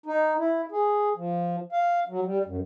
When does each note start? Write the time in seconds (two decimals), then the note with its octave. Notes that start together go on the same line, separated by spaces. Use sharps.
0.06 D#4
0.39 E4
0.72 G#4
1.16 F3
1.72 F5
2.09 F#3
2.25 G3
2.45 F#2